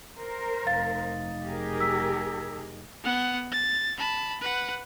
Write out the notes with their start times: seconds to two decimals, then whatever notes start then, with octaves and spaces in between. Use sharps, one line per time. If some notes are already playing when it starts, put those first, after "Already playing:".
0.16 A#4 C5
0.67 F1 D#4 F5 A6
1.43 G4 G#4 A#4
1.80 E6 B6
3.04 B3 F#5
3.52 A6
3.98 A5 B5
4.41 B4 F#5